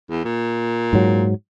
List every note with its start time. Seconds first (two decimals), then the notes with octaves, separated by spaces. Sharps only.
0.10 E2
0.25 A#2
0.93 G#2 F#3